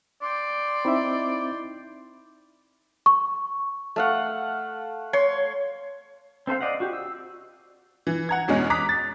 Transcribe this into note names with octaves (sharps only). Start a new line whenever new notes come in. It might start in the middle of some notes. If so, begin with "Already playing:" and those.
D5 G5 C6
C4 D#4 E4 E5 B5
C#6
A3 F5 F#5
C#5 C6
C4 A4 C5 F5
D5 D#5 F5 F#5
F#4 G4
E6
E3
F#5 A#5 G#6
E2 B2 G#3 C#4
A#5 D6 D#6 F#6 B6
A6